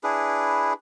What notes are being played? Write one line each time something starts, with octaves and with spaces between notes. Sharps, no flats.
D4 E4 G#4 B4